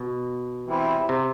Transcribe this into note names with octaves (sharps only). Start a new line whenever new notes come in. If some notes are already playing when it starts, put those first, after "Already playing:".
Already playing: B2
C3 E3 G3 C4 E4
C3